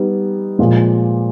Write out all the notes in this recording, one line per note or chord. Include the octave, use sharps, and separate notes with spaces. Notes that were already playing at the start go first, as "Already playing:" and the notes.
Already playing: G3 B3 D#4
A#2 F3 G#3